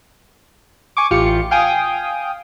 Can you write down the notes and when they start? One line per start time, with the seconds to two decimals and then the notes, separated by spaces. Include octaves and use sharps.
0.97 G#5 C#6 D6
1.11 A1 F4 G4 C#7
1.51 F5 G5 G#5 D#6